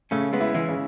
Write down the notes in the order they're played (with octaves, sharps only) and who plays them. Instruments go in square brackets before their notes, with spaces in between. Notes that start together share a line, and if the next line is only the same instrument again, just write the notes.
[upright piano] C#3 [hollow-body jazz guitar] A3 C#4
[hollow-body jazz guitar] G#3 B3
[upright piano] E4
[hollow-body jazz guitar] E3 G#3
[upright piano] C#3